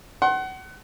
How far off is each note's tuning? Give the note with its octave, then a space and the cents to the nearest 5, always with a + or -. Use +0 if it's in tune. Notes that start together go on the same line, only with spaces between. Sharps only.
F#5 +30 C6 +30